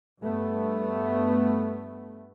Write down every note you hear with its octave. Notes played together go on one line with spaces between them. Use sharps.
G2 A3 B3